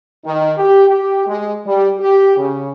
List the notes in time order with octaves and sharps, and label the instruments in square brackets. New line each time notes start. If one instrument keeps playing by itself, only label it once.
[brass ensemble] D#3
G4
G4
G#3
G3
G4
C#3